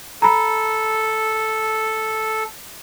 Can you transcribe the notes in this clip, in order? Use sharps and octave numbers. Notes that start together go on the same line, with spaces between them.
A4 A#5 B5